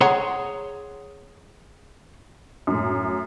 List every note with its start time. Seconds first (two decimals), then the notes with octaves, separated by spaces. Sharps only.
0.01 G#4 C#5 F#5 A#5 C6
2.67 F#2 A2